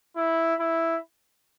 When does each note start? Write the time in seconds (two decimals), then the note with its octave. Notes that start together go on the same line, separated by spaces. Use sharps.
0.17 E4
0.60 E4